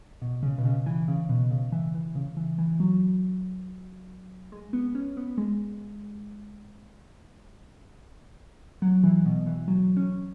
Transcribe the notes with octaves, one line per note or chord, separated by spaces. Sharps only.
B2
C#3
B2
C#3
E3
C#3
B2
C#3
E3
E3
C#3
E3
E3
F#3
G#3
B3
C#4
B3
G#3
F#3
E3
B2
E3
F#3
C#4